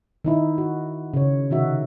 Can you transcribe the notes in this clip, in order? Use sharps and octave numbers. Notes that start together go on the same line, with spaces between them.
D#3 D#4 E4
F#4
C#3 C#5
C3 D#3 D#4 F#4 E5